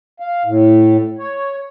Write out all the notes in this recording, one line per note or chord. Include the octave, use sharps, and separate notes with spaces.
F5
A2
C#5